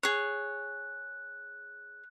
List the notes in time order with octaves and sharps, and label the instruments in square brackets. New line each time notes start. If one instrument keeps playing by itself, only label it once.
[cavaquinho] G#4 C#5 [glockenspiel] F#6